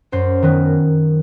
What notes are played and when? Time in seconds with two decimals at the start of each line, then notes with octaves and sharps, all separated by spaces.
0.12 F#2 C5
0.42 D#3 F#3 B3